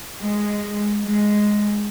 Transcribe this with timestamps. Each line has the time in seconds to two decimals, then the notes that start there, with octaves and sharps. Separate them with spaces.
0.21 G#3
1.06 G#3